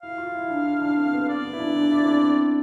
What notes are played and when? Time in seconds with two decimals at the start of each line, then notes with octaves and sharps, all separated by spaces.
0.02 E4 F5
0.18 F4
0.34 E4
0.50 D4
0.65 E4
0.82 D4
0.97 C4
1.13 B3
1.29 D5
1.45 B3
1.53 E4
1.60 D4
1.76 D4
1.92 E4
2.03 C4
2.08 D4
2.23 C4